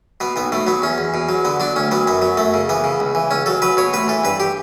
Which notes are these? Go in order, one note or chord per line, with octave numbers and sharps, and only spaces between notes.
B2 B3
B1 B3
B2 A3
F#3 B3
E2 C#4
E2
B2
F#3
D3 B3
F#3 D4
D2 C#4
F#3 B3
F#2 B3
F#3
F#2 A3
C#3
E3 B3
C#3
C#2
E3
C#2 C#4
F#3 A4
F#3 B4
B2 C#5
A1 B4
E3 A4
G2 B4
G4